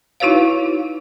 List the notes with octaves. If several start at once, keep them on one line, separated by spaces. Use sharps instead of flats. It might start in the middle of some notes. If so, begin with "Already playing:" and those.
D#4 E4 F#4 B4 C#5 F5